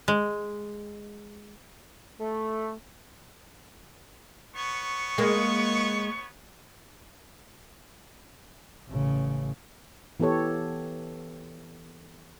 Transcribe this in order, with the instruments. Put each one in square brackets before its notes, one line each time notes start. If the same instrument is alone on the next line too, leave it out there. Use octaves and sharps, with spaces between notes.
[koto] G#3
[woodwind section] A3
[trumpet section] B3 C#5 C#6
[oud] G#3 A#3
[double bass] A1 C#3
[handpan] E3 B3 G4 A4 C#5